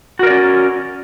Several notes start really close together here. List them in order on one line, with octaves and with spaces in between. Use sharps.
F#4 A#4 D5 C#4